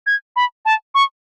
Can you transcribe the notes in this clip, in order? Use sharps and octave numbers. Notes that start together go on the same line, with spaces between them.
G#6
B5
A5
C#6